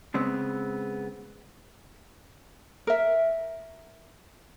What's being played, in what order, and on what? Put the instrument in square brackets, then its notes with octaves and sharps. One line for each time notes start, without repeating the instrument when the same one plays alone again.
[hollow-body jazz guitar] C#3 G#3 B3 C4
[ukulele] A#4 E5